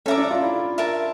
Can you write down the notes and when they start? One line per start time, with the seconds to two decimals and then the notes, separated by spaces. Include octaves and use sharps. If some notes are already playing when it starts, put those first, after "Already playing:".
0.06 C#4 A4 E5 A#5 D6
0.18 D4
0.30 F4
0.42 E4
0.78 A#4 E5 A5